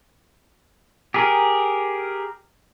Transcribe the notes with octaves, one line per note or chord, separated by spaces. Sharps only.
G4 G#4 A#4